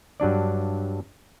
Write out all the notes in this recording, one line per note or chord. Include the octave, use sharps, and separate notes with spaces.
G2 F#3 D4 D5